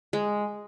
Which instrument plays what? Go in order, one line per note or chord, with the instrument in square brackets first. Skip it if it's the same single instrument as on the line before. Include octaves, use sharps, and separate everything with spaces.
[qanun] G#3